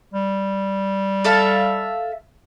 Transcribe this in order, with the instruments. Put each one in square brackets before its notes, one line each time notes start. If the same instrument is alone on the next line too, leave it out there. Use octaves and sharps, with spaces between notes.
[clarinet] G3
[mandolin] A4 E5 F5